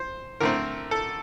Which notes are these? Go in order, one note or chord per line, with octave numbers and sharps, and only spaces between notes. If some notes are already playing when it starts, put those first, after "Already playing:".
Already playing: C5
D3 A3 C4 A#4
A4